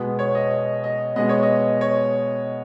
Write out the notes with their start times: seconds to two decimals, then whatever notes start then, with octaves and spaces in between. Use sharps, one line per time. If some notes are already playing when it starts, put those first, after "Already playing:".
Already playing: B2 G#3 B3
0.19 C#5
0.35 D#5
0.84 D#5
1.16 B2 G#3 B3 D#5
1.29 C#5
1.43 D#5
1.81 C#5